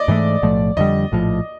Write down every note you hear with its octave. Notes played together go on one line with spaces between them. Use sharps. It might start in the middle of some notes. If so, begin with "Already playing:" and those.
Already playing: D5 D#5
G#2 E3 A3
B1 A2 F3 A3
F2 D3 G3 D#5
A#1 A2 F3